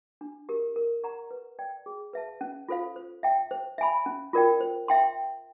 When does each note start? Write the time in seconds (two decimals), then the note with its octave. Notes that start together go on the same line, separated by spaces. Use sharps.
0.21 D4
0.49 G4 A#4
0.76 A#4
1.03 D5 F#5 A#5 C#6
1.31 B4
1.59 D5 G5
1.86 G#4
2.13 B4 E5 A5
2.41 C#4
2.69 F4 A4 C5 F5
2.96 C5
3.23 E5 G5
3.51 C5
3.78 E5 G#5 B5
4.06 C#4
4.33 F4 A#4 D5 G5
4.61 C5
4.88 E5 G5 C6